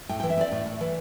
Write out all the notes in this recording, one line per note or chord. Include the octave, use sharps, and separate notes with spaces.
A2 G5
E3 G5
E5
C4 D5
A2
A2
E3